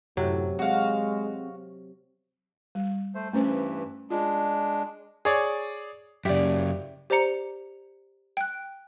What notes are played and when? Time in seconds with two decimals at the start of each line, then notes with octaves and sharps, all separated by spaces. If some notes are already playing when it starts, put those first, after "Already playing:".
0.17 F#2 A2 C3 F#3
0.59 G#3 C4 F#4 F5
2.75 G3
3.15 A3 C5
3.33 G2 E3 A3 C#4 C5
4.11 G#3 D4 F4
5.25 G#4 C#5 D5
6.25 F#2 C#3 G4 D5 E5
7.10 G4 C5 D5 A#5 C#7
8.37 G5 F#6